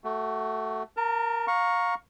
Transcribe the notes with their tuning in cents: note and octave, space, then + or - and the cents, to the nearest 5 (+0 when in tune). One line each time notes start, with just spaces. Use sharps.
A3 +0 F#4 +20
A#4 +0 A5 +45
F5 +25 A#5 +0 C#6 +0